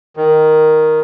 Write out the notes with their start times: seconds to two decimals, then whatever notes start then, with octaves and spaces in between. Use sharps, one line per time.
0.17 D#3